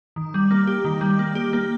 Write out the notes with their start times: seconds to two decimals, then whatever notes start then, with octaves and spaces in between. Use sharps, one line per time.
0.16 D#3
0.34 G3
0.51 A#3
0.67 G4
0.85 D#3
1.01 G3
1.19 A#3
1.35 G4
1.53 A#3